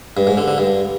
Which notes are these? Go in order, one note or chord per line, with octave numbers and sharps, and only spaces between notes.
G2
G#2
D3
D3
G2